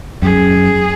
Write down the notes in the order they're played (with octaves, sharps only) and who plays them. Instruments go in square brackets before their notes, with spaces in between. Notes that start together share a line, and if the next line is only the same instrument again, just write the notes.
[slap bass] F#2 [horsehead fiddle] G#4